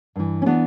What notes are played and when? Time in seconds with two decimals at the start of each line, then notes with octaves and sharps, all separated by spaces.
0.16 G2 E3
0.42 C#4
0.46 E3 B3 D4